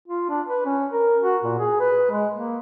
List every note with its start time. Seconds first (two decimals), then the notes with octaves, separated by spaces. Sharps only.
0.07 F4
0.29 D4
0.48 B4
0.65 C#4
0.92 A#4
1.23 F#4
1.43 A#2
1.59 G#4
1.80 B4
2.11 G#3
2.36 A#3